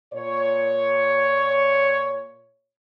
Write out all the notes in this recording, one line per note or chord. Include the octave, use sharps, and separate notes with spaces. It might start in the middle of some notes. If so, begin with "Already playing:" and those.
A#2 C#5